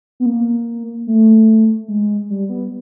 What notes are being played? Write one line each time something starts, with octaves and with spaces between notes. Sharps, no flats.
B3
A#3
A3
G#3
G3
B3